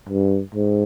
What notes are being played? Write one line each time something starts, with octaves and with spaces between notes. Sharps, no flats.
G2
G#2